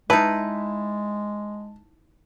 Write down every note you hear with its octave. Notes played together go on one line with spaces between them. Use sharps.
G#3 D#4 E4 B4 A5